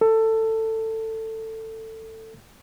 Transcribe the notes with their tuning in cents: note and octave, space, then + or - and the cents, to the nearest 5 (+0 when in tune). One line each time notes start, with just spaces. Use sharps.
A4 +15